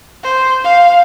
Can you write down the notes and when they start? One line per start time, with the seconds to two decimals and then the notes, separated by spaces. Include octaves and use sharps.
0.23 C5
0.64 F5